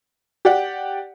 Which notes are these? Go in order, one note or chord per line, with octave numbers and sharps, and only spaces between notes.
G4 D5 F#5